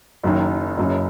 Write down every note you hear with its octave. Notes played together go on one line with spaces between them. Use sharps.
F#1 F#2 D#3
F#1 F#2 C#3